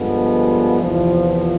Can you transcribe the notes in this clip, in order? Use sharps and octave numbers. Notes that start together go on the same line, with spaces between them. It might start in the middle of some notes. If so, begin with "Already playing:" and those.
Already playing: G2 D3 F3 G#3 B3
E2 C3 F3